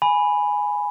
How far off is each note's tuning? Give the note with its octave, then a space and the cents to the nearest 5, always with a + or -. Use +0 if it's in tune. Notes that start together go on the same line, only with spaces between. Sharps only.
G#5 +0 B5 +0